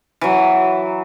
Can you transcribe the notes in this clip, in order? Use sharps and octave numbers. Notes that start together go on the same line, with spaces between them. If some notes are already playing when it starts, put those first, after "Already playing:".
E3 F#3